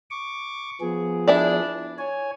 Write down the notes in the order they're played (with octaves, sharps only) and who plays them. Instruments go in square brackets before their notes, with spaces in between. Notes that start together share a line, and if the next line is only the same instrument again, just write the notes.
[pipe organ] C#6 D6
F3 B3 G#4
[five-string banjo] D4 E4 D5
[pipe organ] C#5 G#5